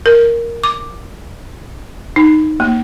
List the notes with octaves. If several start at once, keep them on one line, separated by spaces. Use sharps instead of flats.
A#4
D6
D#4
A#3